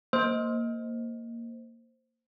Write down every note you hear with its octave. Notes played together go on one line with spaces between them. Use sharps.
A#3 C5